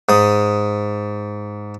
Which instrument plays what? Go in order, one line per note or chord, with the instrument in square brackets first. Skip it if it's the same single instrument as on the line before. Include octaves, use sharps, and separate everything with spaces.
[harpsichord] G#2 D#6